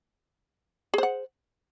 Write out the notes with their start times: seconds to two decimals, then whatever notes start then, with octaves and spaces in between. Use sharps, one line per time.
0.94 G#4
0.98 C5
1.03 F#5